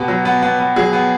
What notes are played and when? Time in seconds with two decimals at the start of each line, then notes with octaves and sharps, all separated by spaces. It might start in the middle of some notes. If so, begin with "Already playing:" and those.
Already playing: B2 B3 G4
0.08 F#3
0.25 B3
0.42 B3
0.59 B3
0.76 F#3 G#4
0.93 B3